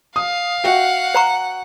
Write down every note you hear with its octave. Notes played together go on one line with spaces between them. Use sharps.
F5 D#6
F#4 E5 F#5 G5
C5 A#5 C#6